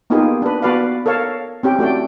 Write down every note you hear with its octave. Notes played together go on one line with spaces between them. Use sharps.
A#3 B3 D#4 F4 G4 G#4
D4 B4
B3 F#4 B4 D5 F5
A4 A#4 C#5 F5
C4 C#4 G4 G5
A3 F#4 D5 G5